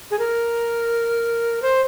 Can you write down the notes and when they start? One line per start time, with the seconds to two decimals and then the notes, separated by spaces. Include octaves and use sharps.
0.11 G#4
0.19 A#4
1.62 C5